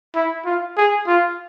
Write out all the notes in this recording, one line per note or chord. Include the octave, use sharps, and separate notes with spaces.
E4
F4
G#4
F4